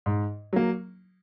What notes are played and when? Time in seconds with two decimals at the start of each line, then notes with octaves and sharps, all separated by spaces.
0.06 G#2
0.53 F#3 A#3